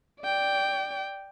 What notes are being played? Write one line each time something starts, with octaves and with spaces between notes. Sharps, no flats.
D5 G5